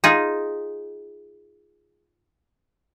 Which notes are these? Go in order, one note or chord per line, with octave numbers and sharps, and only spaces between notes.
D#4 F4 G#4